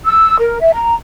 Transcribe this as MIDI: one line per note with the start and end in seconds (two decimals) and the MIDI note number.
0.05 0.35 88
0.39 0.60 70
0.60 0.70 76
0.73 0.95 82